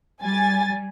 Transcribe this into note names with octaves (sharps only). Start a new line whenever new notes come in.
G3 G#5 A6